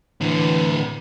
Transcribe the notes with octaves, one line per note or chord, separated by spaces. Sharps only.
A2 D3 E3